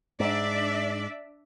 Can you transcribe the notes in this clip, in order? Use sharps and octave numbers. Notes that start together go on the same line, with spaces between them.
G#2 D4 D5 E5